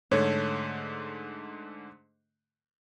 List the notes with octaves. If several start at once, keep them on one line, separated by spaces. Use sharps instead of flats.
G#2 D3 A3 A4 C#5